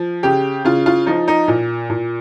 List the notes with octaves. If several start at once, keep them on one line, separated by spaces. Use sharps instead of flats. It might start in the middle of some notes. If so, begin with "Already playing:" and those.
Already playing: F3
C#3 G4
C#3 F4
F4
F3 D#4
D#4
A#2
A#2